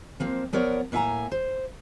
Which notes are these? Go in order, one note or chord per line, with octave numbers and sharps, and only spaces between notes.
F3 A#3 C4
F3 B3 A#4 C#5 D5
A2 A#3 E5 F#5 G#5 A#5
C5